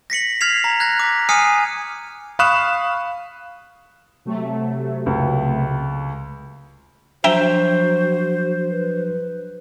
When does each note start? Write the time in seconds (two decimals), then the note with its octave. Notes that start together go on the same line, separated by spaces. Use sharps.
0.10 A#6 B6 C#7 F#7
0.41 F6 G#6 B6 C7 F7
0.64 A#5
0.80 F#6 G#6 A#6
1.00 D6 B6
1.29 G#5 D#6 F6 C7 C#7 D#7
2.39 F5 B5 C#6 D#6 F#6 E7
4.25 C3 F#3 A3
5.06 C#2
7.24 F3 F#3 D4 F#4 C5 E5 G5 A#5
8.71 B4